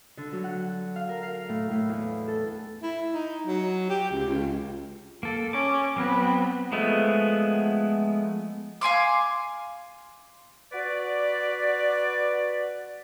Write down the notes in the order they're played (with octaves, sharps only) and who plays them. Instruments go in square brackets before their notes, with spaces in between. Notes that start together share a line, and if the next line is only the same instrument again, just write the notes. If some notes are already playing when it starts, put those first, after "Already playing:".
[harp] D3
F#3
F#5
F5
A#4
F5
A2
A2
E2
A4
[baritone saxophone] E4
D#4
F#3
G4
C#2
C#2
[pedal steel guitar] A#3 A4
[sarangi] C#4 [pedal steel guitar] D6
[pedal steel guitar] F#3 C4 [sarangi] B3
[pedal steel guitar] F3 G#3 A3 B3
[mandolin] F5 G#5 C6 D6
[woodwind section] F#4 B4 D5